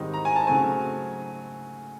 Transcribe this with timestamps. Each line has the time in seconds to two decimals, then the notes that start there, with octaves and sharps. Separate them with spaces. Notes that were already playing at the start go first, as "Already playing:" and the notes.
Already playing: G#2 D#3 G3 C4 D#4
0.14 A#5
0.25 G#5
0.36 A5
0.46 C#3 F#3 A3 C4 G#5